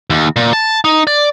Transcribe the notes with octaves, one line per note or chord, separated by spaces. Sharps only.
D#2
A#2
A5
D#4
D5